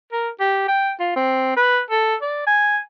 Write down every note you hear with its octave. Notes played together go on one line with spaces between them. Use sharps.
A#4
G4
G5
F4
C4
B4
A4
D5
G#5